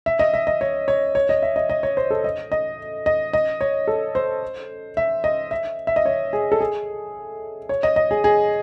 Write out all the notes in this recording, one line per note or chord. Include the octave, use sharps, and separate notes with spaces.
E5
D#5
E5
D#5
C#5
C#5
C#5
D#5
E5
D#5
D#5
C#5
C5
A4
D#5
D#5
D#5
D#5
C#5
A4
C5
E5
D#5
E5
E5
D#5
C#5
G#4
A4
G#4
C#5
D#5
D#5
G#4
G#4